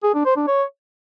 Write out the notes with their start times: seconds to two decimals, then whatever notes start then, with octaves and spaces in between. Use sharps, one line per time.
0.04 G#4
0.15 D4
0.26 C5
0.37 D4
0.48 C#5